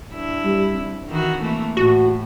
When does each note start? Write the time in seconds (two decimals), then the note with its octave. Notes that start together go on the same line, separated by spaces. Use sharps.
0.12 G2 E4
0.45 G3
0.75 C4
1.08 D#3 E3 F#4
1.41 E3 A3 A#3
1.77 A2 F#4